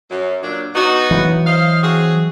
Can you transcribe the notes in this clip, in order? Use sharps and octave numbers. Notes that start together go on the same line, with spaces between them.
F#2
A#2 F#3 D4
B3 D#4 F#4
E3 F#3
C5 D#5 F5
C4 F#4 G#4